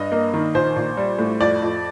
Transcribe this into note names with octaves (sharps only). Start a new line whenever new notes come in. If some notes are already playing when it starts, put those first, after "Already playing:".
Already playing: G2 D#5
A#3
D#3
A#1 C5
A#1
G3
A2
F2 D5
F2